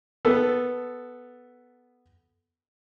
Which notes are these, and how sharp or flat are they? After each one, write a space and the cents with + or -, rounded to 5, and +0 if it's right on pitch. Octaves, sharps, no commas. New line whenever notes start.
B3 +0 A4 -5